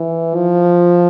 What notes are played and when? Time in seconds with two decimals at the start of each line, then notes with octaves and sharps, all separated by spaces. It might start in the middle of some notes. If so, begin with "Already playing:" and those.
Already playing: E3
0.35 F3